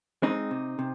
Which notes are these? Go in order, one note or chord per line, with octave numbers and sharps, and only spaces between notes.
G#3 C4 D#4
C3
C3